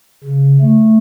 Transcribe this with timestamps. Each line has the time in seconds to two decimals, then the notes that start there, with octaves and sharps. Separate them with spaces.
0.24 C#3
0.60 A3